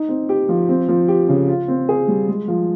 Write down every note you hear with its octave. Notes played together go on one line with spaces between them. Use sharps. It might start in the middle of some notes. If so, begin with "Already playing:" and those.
Already playing: D#4
C4
G4
F3
C4
F3
G4
C#3
F4
C4
G#4
G3
G#3
F3